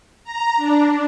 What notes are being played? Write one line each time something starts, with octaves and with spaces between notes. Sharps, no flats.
A#5
D4